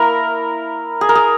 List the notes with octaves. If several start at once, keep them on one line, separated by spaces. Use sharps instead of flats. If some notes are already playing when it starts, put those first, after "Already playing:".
Already playing: A#3 E4 A#4
G#4
A#4
G#4